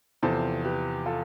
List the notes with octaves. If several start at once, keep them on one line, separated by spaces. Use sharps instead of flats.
E2 C3 F3 A4 C5
G4 B4
F4 A4